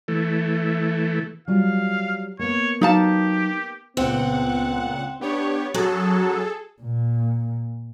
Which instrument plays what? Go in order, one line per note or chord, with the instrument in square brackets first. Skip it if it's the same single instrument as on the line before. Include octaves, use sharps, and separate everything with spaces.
[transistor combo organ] E3 A3
[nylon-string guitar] F#3 G3 F4 [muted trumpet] F5
[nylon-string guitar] A#3 B3 [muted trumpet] C#5
[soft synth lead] F#3 [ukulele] D#4 F5 A5 [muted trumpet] G4
[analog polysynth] C#2 A#2 F#5 [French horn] B3 [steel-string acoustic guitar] C4
[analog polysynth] B3 G4 C#5 [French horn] D4
[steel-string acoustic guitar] F#2 [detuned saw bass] F#3 [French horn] F#4 [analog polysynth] G#4 A4
[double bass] A#2